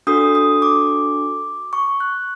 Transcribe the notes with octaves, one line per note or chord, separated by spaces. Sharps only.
D4 F#4 A4 D#6
D#6
D6
C#6
F#6